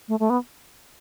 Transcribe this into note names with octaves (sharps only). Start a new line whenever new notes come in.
A3
A3
B3